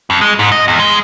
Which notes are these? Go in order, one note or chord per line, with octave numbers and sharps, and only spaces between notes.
F2
G#3
G#2
D#5
E2
G#3